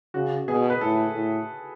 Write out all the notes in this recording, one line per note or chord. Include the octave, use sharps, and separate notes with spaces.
C#3 F#4
B2 G#4
B4
A2 A4
A2